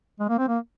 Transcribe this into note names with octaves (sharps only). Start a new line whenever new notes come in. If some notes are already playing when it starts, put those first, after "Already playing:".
G#3
A#3
C4
A#3